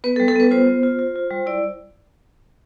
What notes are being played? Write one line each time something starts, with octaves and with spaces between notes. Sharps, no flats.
B3 B4
A4
G3
A4
B3 B4
F4 C5
B3
F4
F4
F4
G3
E4 D5